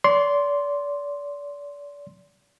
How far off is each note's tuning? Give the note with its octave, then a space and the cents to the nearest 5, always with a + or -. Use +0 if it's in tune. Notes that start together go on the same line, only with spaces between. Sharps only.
D5 -35 C6 +0